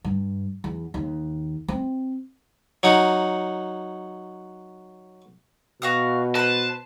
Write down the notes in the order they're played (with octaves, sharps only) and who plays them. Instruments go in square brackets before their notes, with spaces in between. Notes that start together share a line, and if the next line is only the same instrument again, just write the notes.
[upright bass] G2
E2
D#2
C4
[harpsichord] F#3 D#4 F#5
[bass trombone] B2 [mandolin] F#4 F5 D#6
[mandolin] B4 C5 [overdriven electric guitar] A5